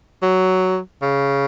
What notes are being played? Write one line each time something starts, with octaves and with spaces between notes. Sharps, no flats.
F#3
C#3